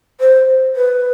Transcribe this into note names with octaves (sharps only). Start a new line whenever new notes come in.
C5
B4